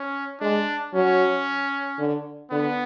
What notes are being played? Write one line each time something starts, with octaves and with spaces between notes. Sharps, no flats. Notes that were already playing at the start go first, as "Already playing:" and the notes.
Already playing: C#4
G#3 D4
F#3 C#4
D3
D3 B3